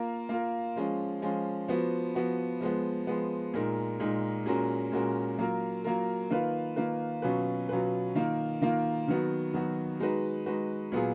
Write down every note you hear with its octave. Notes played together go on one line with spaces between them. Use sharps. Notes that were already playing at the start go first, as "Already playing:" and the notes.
Already playing: A#3 F4 A#4
A#3 F4 A#4
F3 G#3 C#4 F4
F3 G#3 C#4 F4
F3 B3 F#4
F3 B3 F#4
F3 G#3 B3
F3 G#3 B3
A#2 G#3 D#4 A#4
A#2 G#3 D#4 A#4
A#2 G#3 C#4 F#4 A#4
A#2 G#3 C#4 F#4 A#4
F#3 A#3 F4 A#4
F#3 A#3 F4 A#4
D#3 A#3 F4 B4
D#3 A#3 F4 B4
B2 F#3 C#4 F4 B4
B2 F#3 C#4 F4 B4
D#3 A#3 F4
D#3 A#3 F4
D#3 F#3 B3 F#4
D#3 F#3 B3 F#4
G#3 D#4 F#4 B4
G#3 D#4 F#4 B4
A#2 F#3 B3 F4 G#4